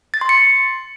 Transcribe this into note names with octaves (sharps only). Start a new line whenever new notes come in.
A6
C6
C#7